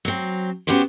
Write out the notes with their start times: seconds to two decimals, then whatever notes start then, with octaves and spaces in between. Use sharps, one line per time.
0.05 F#3 C4
0.67 B3 C#4 F#4 G4 B4 C5